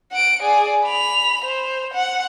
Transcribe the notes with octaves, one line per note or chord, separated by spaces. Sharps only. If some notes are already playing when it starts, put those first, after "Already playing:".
F#5 D7
G#4 D5
B5 F7
C5
F#5